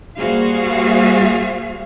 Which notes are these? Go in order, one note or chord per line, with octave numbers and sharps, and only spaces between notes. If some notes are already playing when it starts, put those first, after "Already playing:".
G3 A#3 F#4 G#4 C5 F5